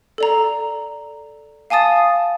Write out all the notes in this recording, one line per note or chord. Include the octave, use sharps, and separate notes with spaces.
A4 D5 A#5
F5 G#5 A5 D#6 A6